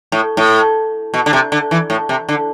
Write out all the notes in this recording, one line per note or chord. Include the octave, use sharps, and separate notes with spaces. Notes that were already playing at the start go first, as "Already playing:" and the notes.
A2
A2
B2
D3
C3
D3
E3
A2
C3
D3